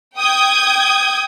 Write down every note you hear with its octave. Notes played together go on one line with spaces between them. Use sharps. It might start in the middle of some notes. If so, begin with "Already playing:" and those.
G5 D#6 G6 G#6